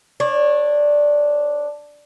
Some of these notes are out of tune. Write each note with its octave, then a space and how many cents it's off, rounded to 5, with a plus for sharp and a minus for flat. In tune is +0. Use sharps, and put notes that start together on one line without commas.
D4 +0 C#5 -25